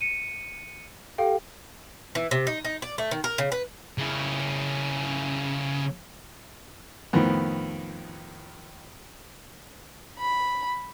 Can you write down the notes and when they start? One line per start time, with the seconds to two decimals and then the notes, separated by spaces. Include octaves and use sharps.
0.01 C#7 D#7
1.18 G4 A4 F5 G5
2.15 E3
2.31 C3
2.47 D#4
2.65 D#4
2.82 D5
2.98 A3
3.11 D#3
3.24 A#4
3.38 C#3
3.52 B4
3.98 C#3 E4
7.13 F2 A2 D#3 B3
10.19 B5